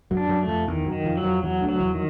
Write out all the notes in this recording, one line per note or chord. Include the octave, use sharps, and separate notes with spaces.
F#2 F#3
D4
F#2 F#3
A3
F2 F3
E2 D#3 E3
F#2 F#3
D#3
F2 F3
F#3
F2 F3
E2 E3 F#3
D2 D3
F#3
E2 E3
D#3 E3